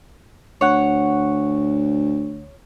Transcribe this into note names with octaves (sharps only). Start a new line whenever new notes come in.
D2 C#5 F#5